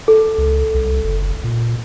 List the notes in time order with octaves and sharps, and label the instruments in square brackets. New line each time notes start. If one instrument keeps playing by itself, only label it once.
[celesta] A4
[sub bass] C#2
C2
F#1
A#2